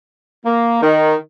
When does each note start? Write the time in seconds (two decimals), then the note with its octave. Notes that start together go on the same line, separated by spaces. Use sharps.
0.46 A#3
0.82 D#3